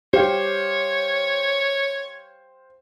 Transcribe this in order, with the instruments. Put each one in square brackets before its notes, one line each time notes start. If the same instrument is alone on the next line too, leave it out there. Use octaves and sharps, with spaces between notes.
[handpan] G4 [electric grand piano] C5 F5 G5 [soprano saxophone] C#5